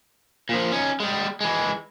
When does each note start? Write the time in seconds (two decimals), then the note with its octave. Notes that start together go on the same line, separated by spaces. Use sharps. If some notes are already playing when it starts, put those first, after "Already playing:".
0.49 A#2 F3
0.72 C#4 D#4
1.00 G3 G#3
1.41 E3 G#3